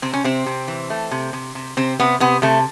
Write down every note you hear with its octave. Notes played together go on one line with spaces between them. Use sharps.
C3 C4
C#4
C3 C4
C3
E3
A3
C3
C3
C3
C3 C4
C3 B3
C3 B3
C3 A3